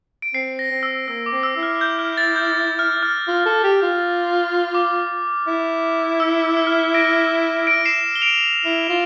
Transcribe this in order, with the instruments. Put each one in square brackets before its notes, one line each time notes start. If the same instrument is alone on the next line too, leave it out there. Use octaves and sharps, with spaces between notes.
[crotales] D7
[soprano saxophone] C4 [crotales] C7
[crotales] A#6
[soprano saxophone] C4
[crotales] E6
[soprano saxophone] A#3 [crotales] E6
[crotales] D6
[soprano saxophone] C4
[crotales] E6
[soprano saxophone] E4
[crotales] F6
G6
F6
A6
G6
F6
F6
[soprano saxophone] F4
A4
G4
F4
[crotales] D6
[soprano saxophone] E4
[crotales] E6
E6
F6
E6
A#6 D7
A#6 D7
C7 E7
G7
D7 F7
[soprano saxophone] E4
F4